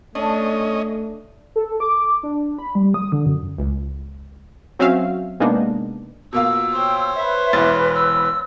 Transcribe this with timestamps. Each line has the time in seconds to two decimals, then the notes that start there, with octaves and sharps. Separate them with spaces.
0.15 A3 C#4 D4 D#5
1.56 A4
1.80 D6
2.23 D4
2.59 B5
2.75 G3
2.94 D#6
3.12 D3
3.26 F#2
3.58 C#2
4.79 F#3 C4 C#4 F#4 E5 F5
5.40 C3 G#3 A#3 B3 D4 D#4
6.33 B2 A#3 F4 E6
6.73 C5 C#5 G5
7.15 B4 E5
7.53 E1 E3 A6
7.95 E6